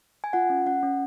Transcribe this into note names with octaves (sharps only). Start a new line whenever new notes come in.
G#5
F4 F#5
C#4
C#4 F#5
C#4